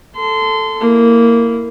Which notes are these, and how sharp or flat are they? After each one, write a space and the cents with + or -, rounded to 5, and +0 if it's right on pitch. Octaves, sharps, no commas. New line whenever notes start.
A4 +0 C6 -25
A#3 -10 E4 +0